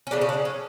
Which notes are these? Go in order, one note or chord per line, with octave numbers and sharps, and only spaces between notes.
C#4
C#3 F3 A3 D4
C#4
D4
C#4